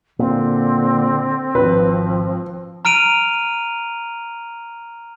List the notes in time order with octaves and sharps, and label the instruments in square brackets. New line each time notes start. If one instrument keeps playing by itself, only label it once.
[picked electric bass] A#2 [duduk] D3 [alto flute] C4
[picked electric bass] D1 G#1 [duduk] F3 [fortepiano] B4
[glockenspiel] A#5 F6 D7 D#7 F7